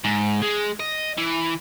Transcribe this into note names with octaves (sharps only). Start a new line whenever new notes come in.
G#2
G#3
D#5
E3